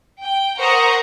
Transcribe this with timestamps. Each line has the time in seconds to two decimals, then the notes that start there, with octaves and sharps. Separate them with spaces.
0.21 G5
0.59 A#4 C5 F#5 A#5 C#6 D#6